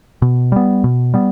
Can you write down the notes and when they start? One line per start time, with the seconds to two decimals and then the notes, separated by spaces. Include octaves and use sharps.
0.22 B2
0.52 G3 B3
0.84 B2
1.14 G3 B3